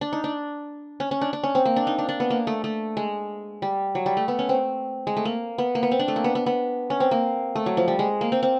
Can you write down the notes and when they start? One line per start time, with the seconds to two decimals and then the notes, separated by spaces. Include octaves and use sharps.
0.01 D4
0.13 D#4
0.24 D4
1.00 C#4
1.11 C#4
1.21 D4
1.33 D4
1.43 C#4
1.55 C4
1.65 A#3
1.76 D4
1.87 D#4
1.98 D4
2.09 D4
2.20 B3
2.30 A#3
2.47 A3
2.64 A3
2.97 G#3
3.62 G3
3.95 F#3
4.06 G3
4.17 A3
4.28 B3
4.39 C#4
4.49 C4
5.07 G#3
5.17 A3
5.25 A#3
5.58 B3
5.75 A#3
5.83 B3
5.91 C4
5.99 D4
6.08 A3
6.16 A#3
6.24 B3
6.35 B3
6.46 B3
6.90 C#4
7.00 C4
7.11 A#3
7.55 A3
7.66 F#3
7.77 F3
7.88 G3
7.99 G#3
8.21 A#3
8.32 C4
8.43 C4